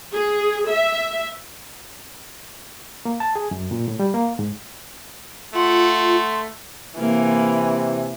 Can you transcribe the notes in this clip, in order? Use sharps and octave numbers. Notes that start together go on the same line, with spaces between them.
G#4
E5
A#3
A5
G#4
F#2
A#2
A2
G3
A#3
G#2
A3 F4 F#5 C6
C3 E3 A#3